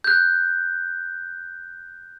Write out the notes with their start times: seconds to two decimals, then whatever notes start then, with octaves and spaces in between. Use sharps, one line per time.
0.04 F#6 G6